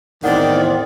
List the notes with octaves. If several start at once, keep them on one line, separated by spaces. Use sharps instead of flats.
E2 A2 D#3 C4 D5 F#5